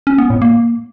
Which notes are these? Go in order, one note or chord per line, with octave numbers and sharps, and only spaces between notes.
C#4
B3
A2
A#3